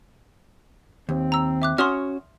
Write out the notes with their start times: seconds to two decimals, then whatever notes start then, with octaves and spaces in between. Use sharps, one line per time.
1.09 D#2 C4
1.32 A#5 E6
1.62 E5 D6 F#6
1.78 C#4 F#4 C#5 C6 D#6 F6